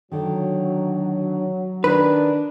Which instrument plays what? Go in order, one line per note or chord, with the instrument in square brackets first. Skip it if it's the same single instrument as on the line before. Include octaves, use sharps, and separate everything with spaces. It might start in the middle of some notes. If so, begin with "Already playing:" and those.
[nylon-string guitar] D3 D#3 [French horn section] F#3
[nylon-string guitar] D#3 [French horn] D4 [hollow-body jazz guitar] B4